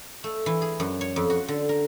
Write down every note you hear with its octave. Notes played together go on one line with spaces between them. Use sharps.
A3
E3
G#4
F#2
C#5
F2
F#4
D3
A#4